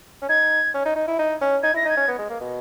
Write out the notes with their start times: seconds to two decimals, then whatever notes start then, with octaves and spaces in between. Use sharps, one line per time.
0.22 C#4
0.29 D#4 G#6
0.74 C#4
0.85 D#4
0.96 D#4
1.07 E4
1.19 D#4
1.41 C#4
1.63 D#4 G#6
1.74 E4 A#6
1.85 D#4
1.89 G#6
1.97 C#4
2.08 B3
2.19 G#3
2.30 A#3
2.41 B2